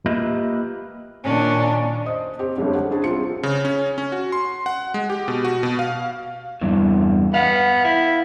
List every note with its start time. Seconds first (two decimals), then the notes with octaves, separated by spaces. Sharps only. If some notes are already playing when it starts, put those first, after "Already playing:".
0.06 A#3 F4 G4 B4 D#5 E5
1.24 A#2 D#3 C#4 D4
2.06 C5 D#5 D#6
2.39 C4 G4
2.56 G1 F2 G#3 C#4 C#5
2.75 F#5
2.91 C#4 D4 G#4 C5 A5
3.04 C2 C4 F4 C#7
3.43 C#3
3.65 C#4
3.98 C#4
4.12 F#4
4.32 C6
4.66 F#5
4.94 G#3
5.10 G4
5.28 B2
5.45 F#4
5.63 B2
5.79 F5
6.61 E2 G2 E3
7.34 B3 F5 F#5
7.84 E4